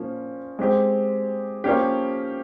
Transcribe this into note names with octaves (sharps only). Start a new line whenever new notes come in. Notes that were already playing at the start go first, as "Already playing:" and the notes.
Already playing: A#2 F3 A#3 C#4 F4
G#3 C4 G4
F3 A#3 C#4 G4